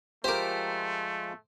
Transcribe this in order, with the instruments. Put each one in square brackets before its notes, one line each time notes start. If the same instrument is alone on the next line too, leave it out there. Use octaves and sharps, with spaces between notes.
[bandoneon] F3 G#3 F4 [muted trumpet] A3 [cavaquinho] G4 A#4 [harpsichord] C5 D6